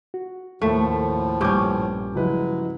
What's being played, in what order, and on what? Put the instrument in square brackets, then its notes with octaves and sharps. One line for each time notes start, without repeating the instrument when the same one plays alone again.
[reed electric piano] F#4
[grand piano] D#2 [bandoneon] A2 F3 [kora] A3
[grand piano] A#1 D6 G6 [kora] G2 C#4
[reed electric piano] C#3 F3 E4 [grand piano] F#3 B4 [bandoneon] G#3